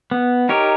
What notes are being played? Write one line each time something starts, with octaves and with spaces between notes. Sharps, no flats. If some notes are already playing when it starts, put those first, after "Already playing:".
B3
D#4 G4 A#4 C#5